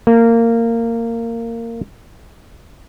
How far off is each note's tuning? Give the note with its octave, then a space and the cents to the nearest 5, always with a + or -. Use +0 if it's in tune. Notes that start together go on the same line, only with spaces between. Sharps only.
A#3 -20